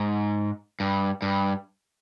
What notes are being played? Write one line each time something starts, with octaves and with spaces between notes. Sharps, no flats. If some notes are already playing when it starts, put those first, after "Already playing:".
Already playing: G#2
G2
G2